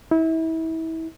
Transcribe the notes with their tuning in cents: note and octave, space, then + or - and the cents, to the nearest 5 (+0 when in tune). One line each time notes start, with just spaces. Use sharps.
E4 -30